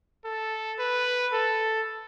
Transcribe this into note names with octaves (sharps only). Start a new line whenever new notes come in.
A4
B4
A4